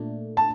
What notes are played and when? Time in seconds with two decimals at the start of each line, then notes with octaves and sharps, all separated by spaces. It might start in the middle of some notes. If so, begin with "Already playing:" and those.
Already playing: A#2 A3 D4
0.37 A5